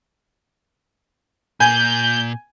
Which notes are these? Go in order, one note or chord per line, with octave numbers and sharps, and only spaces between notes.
A#2 G#5 G6